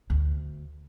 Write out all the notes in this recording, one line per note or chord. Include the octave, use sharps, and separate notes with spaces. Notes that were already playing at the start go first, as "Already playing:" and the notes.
D2